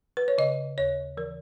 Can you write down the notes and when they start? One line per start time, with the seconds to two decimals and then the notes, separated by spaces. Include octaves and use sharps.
0.17 B4
0.28 C#5
0.38 C#3 D#5
0.78 D#2 C#5
1.17 E3 A#4